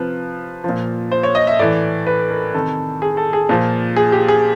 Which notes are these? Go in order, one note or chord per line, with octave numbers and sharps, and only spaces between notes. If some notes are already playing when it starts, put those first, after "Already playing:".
Already playing: C3 F3 B4
A#2 F3
C5
C#5
D#5
E5
A2 E3 D5
B4
A#4
C3 D#3 A4
G#4
A4
G#4
A#2 F3
G#4
G4
G#4